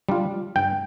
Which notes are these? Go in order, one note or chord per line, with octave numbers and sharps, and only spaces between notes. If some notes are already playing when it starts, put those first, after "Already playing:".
G3 D4 F4
G2 G5